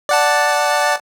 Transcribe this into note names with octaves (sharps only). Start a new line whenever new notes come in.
D5 F#5 A5